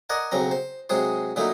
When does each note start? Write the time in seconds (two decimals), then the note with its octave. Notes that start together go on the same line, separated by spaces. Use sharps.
0.10 A#4 D5 D#5 F#5 G#5
0.32 B1 C#3 F#3 C4 A#5
0.51 C5
0.89 C3 F#3 G#3 G#4 C5
1.36 A#2 D3 F#3 A3 D#4 E4